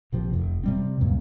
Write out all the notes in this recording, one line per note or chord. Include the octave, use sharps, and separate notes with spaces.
A#1 C3 F3
F1
C3 G3 C4
C#2 F#2 A#2